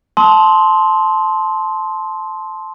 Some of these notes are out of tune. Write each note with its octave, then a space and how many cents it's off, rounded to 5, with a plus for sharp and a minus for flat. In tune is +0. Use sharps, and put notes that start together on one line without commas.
A5 -15 C6 +0 D#6 +45